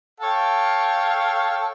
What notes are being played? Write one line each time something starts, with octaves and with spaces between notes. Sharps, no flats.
A4 C#5 F5 G5